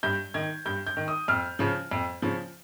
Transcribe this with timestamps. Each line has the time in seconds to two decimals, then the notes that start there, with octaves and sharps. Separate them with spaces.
0.03 G2 G6
0.34 D#3 G#6
0.66 G2 G6
0.87 G6
0.97 D#3
1.08 D#6
1.28 F2 F6
1.59 C#3 F3
1.91 F2
2.22 C#3 F3